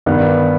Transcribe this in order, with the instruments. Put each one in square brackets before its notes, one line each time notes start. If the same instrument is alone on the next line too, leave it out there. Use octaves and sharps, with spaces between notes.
[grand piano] G2 D#3 G3 B3